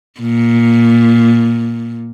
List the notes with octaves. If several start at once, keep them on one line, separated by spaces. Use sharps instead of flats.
A#2